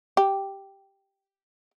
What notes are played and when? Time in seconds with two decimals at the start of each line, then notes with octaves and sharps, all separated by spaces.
0.17 G4